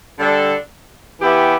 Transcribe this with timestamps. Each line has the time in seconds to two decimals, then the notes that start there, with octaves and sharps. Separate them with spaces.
0.18 D3 G3 D4 A4
1.20 E3 B3 E4 G4